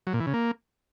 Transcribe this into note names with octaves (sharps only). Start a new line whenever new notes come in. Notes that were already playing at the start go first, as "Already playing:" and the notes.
F#3
A#2
E3
C#3
A#3